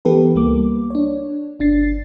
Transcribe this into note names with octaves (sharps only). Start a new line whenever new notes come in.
E3 B3 G4 A4 B4
C#2 G3 A#3 D6
D4 C#5
G1 D4 A6 C7